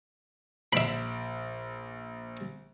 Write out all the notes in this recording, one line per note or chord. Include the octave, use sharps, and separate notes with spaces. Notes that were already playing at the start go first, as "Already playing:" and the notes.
A#1 E5 B5 D7